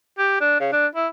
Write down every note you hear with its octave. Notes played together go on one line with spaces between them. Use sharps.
G4
D4
C#3
D4
E4